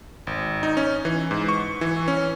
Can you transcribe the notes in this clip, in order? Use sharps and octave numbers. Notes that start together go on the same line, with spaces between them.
G#1
D#4
C#4
E3
G#2
C#6
E3
C#4